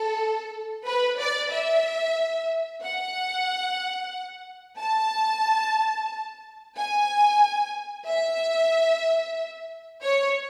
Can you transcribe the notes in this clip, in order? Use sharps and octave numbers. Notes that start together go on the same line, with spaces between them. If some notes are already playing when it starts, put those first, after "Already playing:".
Already playing: A4
B4
D5
E5
F#5
A5
G#5
E5
C#5